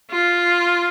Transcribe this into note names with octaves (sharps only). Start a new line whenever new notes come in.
F4